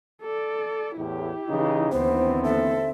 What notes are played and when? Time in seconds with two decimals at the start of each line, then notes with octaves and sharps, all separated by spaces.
0.22 A4 D5
0.97 E2 A2 E4 G4
1.48 C#3 E3 D#4
1.92 D#2 D3 E3 B3 C4 C5
2.44 A4 E5